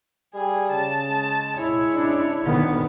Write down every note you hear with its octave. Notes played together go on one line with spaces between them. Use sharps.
G3 G#4
C#3 A5
G#3
E4 C#5
C#4 D4
D2 D3 D#3 B3